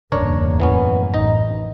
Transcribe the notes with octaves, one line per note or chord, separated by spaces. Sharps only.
D1 E2 G2 C#3 A#3 D4 A#4 C#5
F#2 A2 E3 B3 C#4
A1 D#4 A#5